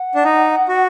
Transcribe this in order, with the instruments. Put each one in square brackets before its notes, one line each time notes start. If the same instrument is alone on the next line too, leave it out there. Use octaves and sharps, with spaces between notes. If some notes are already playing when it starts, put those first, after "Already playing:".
Already playing: [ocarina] F#5
[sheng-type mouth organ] D4
D#4
F#4